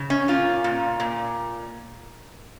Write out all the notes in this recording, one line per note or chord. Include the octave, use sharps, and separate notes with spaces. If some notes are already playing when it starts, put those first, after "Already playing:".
Already playing: C#3
C#4
A#2 F4
A#2
A#2